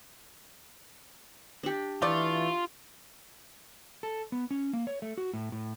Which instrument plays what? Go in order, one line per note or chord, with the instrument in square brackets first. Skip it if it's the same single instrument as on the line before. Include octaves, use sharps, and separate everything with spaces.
[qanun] D4 G4
[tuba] E3 [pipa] A3 D5 [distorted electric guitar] F4
[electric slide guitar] A4
B3
C#4
A#3
C#5
A3
F#4
A2
A2